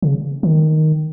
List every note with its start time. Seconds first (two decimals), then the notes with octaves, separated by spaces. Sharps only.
0.02 C#3
0.43 D#3